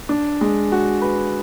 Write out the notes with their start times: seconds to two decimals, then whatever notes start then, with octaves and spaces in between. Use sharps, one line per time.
0.09 D4
0.41 G#3
0.72 F#4
1.02 B4